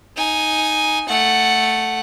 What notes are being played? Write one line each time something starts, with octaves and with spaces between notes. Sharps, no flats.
D#4 G#5
A3 F#5